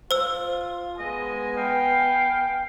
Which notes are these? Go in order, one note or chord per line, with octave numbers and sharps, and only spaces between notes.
F4 C5 E6
G#3 B3 D#5 G#5
F5 G5